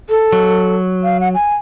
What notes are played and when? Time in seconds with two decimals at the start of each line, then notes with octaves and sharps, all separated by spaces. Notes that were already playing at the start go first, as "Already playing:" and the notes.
0.09 A4
0.33 F#3
1.03 F5
1.20 F#5
1.34 G#5